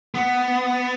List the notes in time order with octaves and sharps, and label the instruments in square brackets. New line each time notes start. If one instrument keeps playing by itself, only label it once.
[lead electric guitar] B3